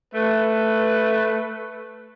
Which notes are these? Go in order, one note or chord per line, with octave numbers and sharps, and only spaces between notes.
A3 B4